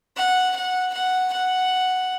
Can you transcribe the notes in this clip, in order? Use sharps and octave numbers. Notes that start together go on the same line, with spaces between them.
F#5
F#5
F#5
F#5